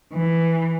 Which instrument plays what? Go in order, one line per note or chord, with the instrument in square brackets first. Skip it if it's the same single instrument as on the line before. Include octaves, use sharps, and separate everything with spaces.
[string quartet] E3